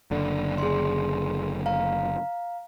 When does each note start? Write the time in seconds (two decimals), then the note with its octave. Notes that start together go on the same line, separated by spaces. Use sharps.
0.11 F#1 D3 D4
0.58 G#4 C6
1.66 F5 A#5